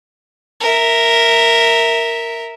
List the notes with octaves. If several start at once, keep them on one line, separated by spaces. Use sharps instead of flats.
A#4 E5